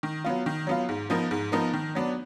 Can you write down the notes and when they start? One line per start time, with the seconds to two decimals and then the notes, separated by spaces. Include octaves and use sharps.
0.03 D#3
0.24 F#3 B3 F4
0.46 D#3
0.67 F#3 B3 F4
0.89 G#2
1.10 F3 B3 D#4 A#4
1.31 G#2
1.52 F3 B3 D#4 A#4
1.73 D#3
1.95 F#3 B3 D4